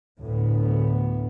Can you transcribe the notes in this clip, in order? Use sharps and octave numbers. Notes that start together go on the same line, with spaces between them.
D2 A2 B3